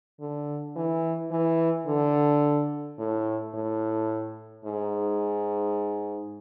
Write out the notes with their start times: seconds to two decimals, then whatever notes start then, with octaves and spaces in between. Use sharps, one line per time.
0.20 D3
0.76 E3
1.31 E3
1.87 D3
2.98 A2
3.54 A2
4.65 G#2